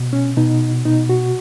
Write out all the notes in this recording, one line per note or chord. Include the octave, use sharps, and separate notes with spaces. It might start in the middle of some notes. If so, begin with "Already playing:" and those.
Already playing: B2
C#4
B2 D#4
B2 D#4
F#4